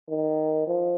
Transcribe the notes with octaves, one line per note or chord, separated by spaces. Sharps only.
D#3
F3